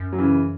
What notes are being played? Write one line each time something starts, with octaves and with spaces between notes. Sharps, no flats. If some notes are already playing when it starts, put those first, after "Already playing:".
Already playing: F#2
F#3
C#3 E3